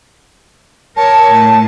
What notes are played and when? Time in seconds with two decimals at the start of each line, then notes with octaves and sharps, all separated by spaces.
0.97 A#4 C#5 A5
1.31 A2